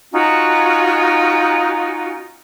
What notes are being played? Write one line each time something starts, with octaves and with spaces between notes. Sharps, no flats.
C#4 D#4 F4 F#4